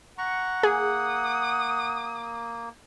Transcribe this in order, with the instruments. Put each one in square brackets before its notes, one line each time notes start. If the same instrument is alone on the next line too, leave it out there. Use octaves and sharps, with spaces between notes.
[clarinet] F#5 [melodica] A#5 C#6
[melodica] A#3 [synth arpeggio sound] G#4 [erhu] D#6